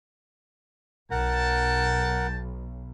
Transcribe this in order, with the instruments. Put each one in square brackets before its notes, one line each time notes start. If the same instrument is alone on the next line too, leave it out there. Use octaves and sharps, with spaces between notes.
[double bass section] B1 [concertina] A#4 F#5 [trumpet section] G5 A5